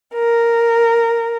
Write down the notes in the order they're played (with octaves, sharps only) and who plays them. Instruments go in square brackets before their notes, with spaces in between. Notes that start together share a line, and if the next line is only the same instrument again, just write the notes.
[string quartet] A#4